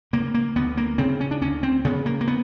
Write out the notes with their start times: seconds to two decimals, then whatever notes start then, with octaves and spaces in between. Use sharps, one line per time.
0.13 C#3 A#3
0.34 A#3
0.56 D2 B3
0.77 A#3
0.98 C#3 C4
1.20 C#4
1.31 D4
1.41 D2 C#4
1.63 C4
1.85 C#3 B3
2.06 A#3
2.21 A#3
2.28 B3